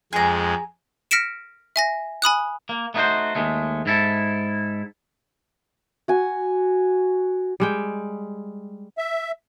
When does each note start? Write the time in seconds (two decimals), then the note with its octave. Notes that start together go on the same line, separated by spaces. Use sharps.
0.13 F2 G#3 G#4 A#5
1.11 F6 A#6 B6 C#7 D7 E7
1.76 E5 G#5 A#6
2.22 G#5 B5 D#6 F#6
2.69 A#3
2.94 A3 B3 D#4 E4 F#4 C5
3.35 D#2 G#3 A3
3.86 G#2 E4 A4
6.08 F#4 G#5
7.60 G3 G#3 G5
8.98 E5